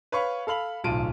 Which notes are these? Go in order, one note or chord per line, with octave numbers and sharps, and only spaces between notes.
B4 C#5 F5 B5 C#6
A4 F5 B5 F#7
D1 B1 F4 A5 D7 D#7